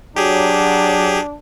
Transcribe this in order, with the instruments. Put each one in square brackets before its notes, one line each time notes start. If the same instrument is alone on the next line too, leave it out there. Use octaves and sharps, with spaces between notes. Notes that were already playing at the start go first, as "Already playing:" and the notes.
[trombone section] F#3 [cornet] D4 [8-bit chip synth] G4 G#4